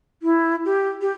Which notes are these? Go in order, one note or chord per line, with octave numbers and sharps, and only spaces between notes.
E4
G4
G4